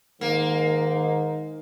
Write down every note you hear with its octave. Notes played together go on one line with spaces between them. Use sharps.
G#2 D#3 A#3 D#4